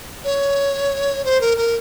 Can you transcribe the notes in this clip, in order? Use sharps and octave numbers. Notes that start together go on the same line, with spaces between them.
C#5
C5
A#4
A#4